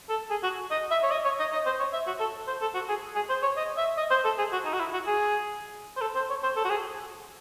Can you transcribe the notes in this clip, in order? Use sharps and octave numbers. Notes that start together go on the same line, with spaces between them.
A4
G#4
F#4
D#5
E5
C#5
D#5
C#5
D#5
D#5
C5
C#5
E5
F#4
A4
C5
A4
F#4
G#4
G#4
C5
C#5
D#5
E5
D#5
C5
A4
G#4
F#4
D#4
F#4
E4
F#4
G#4
C5
A4
C5
C#5
C5
A4
F#4
G#4